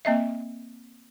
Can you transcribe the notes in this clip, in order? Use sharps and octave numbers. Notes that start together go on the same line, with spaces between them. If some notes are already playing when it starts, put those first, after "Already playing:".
A#3 C4 D#5 E5